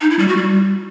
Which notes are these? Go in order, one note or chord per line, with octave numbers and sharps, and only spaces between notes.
D#4
E4
G3
F#4
G3